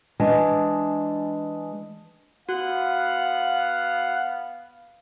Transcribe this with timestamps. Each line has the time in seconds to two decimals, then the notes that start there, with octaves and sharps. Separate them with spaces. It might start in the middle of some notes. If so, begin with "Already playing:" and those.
0.20 E3 G#3 D4 G#5
2.49 B3 F#4 F5 F#5